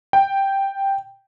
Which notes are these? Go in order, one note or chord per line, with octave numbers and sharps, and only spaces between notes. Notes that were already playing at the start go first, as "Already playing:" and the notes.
G5